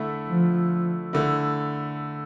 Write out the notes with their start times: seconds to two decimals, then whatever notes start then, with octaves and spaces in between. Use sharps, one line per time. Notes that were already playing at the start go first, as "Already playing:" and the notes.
Already playing: D3 A3 E4
0.28 F3
1.13 D3 A3 E4